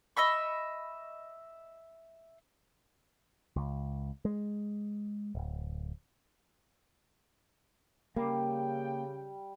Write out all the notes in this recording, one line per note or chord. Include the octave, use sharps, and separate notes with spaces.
D#5 E5 B5 C#6
C#2
G#3
D1
C#3 G3 A#3 G5